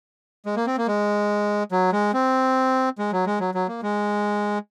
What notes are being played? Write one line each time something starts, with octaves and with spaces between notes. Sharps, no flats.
G#3
A#3
C4
A#3
G#3
F#3
G#3
C4
G#3
F#3
G#3
F#3
F#3
A#3
G#3